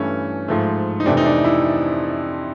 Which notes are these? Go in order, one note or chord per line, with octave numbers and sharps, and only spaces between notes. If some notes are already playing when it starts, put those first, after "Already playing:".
Already playing: G2 E3 A3 C#4
G#2 F3 A3
D#4
F2 C3 E3 A3 D4
D#4
D4
E4